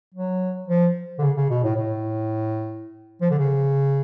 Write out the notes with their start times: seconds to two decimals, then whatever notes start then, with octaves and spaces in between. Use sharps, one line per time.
0.15 F#3
0.68 F3
1.19 D3
1.22 C#3
1.37 C#3
1.50 B2
1.64 A2
1.76 A2
3.21 F3
3.30 D3
3.39 C#3